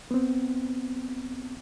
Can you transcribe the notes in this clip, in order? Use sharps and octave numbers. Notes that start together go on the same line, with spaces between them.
B3 C4